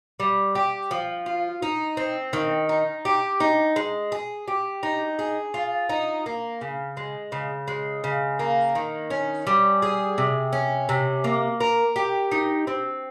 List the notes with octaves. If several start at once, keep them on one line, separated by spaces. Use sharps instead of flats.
G3
G4
F3
F4
D#4
C4
D#3
D#4
G4
D#4
G#3
G#4
G4
D#4
G#4
F4
D#4
A#3
C#3
G#3
C#3
G#3
C#3
A#3
D#3
C#4
G3
G#4
C3
C#4
C3
A#3
A#4
G4
D#4
C4